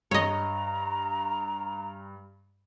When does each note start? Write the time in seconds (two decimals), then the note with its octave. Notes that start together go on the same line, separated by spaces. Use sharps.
0.11 G2 C#5 D#5 A#5